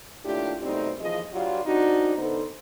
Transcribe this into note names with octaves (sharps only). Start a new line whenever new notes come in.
D#2 A2 D4 E4 F4 G4
F#2 B2 G3 A3 C4 D#4
D#2 E3 F3 F4 G#4 D#5
G2 F#3 G3 F4
C4 D4 D#4 F#4
D3 B3 D#4 A4 C5